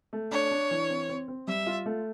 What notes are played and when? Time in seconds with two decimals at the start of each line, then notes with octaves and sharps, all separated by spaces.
0.13 A3
0.31 D4 C#5
0.51 D4
0.71 E3
0.89 C4
1.09 C4
1.28 C4
1.48 G3 E5
1.67 F4
1.86 A3